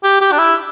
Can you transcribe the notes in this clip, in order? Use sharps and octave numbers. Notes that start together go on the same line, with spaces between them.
G4
G4
D4
E4